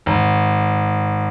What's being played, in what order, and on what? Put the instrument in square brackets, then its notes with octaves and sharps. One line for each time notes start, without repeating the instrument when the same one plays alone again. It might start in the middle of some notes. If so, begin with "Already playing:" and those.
[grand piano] G#1